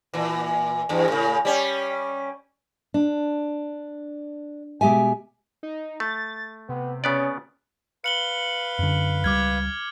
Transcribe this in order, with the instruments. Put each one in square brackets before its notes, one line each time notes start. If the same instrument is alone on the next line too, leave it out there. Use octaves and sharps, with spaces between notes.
[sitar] A#2 E3
E2 G2
A2 C#3
G3 C#4
[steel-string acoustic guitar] D4
B2 G#3 G4 E5 G#5
[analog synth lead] D#4
[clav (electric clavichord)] A3 [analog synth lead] A6
[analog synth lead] C3 [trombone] B3
[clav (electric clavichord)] C#3 B3 D5 [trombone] C#4
[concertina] B4 F5 [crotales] C#7 F#7 G7
[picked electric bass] F#2 D3
[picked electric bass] C#2 G3 [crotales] D6 F6 G#6